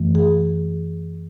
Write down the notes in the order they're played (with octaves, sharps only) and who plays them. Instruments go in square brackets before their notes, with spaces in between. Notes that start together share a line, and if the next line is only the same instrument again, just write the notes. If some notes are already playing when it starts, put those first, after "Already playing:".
Already playing: [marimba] F#2 E3 A3
G#4